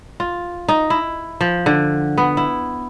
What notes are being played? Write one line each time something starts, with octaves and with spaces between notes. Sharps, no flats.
F4
D#4
E4
F3
D3
B3
E4